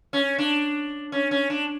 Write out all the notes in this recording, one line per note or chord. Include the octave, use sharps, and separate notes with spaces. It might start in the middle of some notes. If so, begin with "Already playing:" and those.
C#4
D4
C#4
C#4
D4